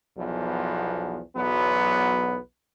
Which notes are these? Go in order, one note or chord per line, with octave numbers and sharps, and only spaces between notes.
B1 E2 F3
B1 E2 F#3 B3